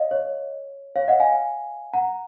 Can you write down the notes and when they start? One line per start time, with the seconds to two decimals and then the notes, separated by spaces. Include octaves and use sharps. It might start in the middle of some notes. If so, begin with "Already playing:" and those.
Already playing: C#5 D#5 F5
0.11 C#5
0.95 C#5 F5
1.08 D#5 F#5
1.20 F5 G#5
1.93 F#5 A#5